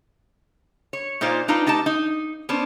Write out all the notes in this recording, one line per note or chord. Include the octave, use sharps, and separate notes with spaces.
C#5
A#2 D#4 F4 C5 D5
D4 D#4 F4 B4
A3 D#4 G4 A5
D#4
B3 C#4 D4 C5